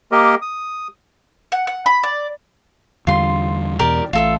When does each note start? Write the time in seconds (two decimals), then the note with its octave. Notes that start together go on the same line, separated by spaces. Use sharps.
0.12 A#3 G4 A#4 D#5
0.42 D#6
1.52 F#5
1.67 F#5
1.86 B5
2.03 D5
3.07 E2 D3 G3 F4 C6
3.79 E2 B2 G4 A#4 D5
4.13 A1 A2 F4 A4 E5